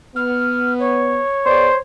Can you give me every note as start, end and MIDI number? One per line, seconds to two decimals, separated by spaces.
0.16 1.20 59
0.16 0.72 89
0.79 1.79 73
1.46 1.69 59
1.46 1.69 68
1.46 1.76 72
1.46 1.69 74